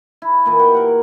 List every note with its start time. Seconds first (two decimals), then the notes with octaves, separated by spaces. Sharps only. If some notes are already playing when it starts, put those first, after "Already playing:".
0.22 E4
0.46 A#2 E3
0.59 F#4 G4 G5
0.72 A#4 F#5 G5